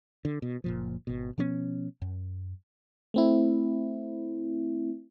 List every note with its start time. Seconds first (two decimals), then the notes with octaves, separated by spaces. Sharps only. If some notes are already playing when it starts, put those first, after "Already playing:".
0.25 D3
0.42 B2
0.64 F#1 A#2 F3
1.07 G#1 B2
1.38 B2 F3 B3 C#4
2.02 F#2
3.14 A3 C4 E4